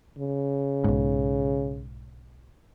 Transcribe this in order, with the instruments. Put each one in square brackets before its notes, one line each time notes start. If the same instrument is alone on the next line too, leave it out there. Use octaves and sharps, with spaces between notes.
[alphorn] C#3
[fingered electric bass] B1 G#2